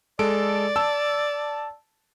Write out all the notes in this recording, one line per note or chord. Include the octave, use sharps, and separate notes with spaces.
G#3 A4 D5 D7
A5 E6